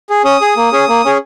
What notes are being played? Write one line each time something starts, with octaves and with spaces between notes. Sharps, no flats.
G#4
C#4 D#6
G#4
A#3
C#4 G#4
A#3
C#4 G#4